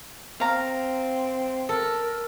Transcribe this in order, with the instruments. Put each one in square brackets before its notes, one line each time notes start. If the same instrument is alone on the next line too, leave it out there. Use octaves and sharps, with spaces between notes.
[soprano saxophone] C4 [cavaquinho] F5 A#5
[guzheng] A4 [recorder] A#4